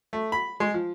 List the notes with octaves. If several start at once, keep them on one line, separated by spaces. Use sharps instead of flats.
A3
B5
G#3
F3